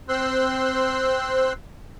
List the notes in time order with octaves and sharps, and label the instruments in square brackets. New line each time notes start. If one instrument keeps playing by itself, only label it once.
[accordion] C4 C5 C6 E6 F#6